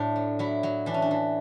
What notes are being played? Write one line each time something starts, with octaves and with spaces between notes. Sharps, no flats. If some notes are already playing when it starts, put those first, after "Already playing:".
Already playing: A2 D4
F#3
F#3 E4
F#3
E3 D4
C#4
D4
E3